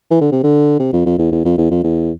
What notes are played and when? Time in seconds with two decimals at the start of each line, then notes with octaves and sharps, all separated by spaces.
0.11 E3
0.21 D3
0.32 C3
0.43 D3
0.80 C3
0.93 F2
1.06 F2
1.18 E2
1.32 E2
1.45 F2
1.58 E2
1.71 F2
1.84 E2